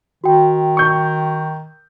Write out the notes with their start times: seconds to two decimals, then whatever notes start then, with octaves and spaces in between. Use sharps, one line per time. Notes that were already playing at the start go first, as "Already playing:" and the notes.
0.24 D#3 F#4 G5
0.77 C#6 G6